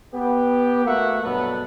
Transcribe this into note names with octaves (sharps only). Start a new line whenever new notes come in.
B3 G4
A3 A#3 F#4 E5 F#5
G2 B2 F#3 B3 A4 B4